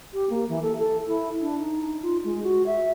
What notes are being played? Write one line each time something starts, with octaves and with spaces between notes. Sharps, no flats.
G4
A#3
E3
A4
A4
E4
D4
D#4
F4
G#3
F#4
E5